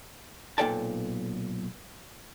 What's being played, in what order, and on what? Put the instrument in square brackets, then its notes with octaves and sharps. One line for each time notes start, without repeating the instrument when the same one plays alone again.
[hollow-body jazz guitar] B1 A#2 A4 D5 G5 A5